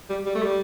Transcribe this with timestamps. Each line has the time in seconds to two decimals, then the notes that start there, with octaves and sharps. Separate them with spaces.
0.10 G3
0.26 G3
0.35 A3
0.43 G3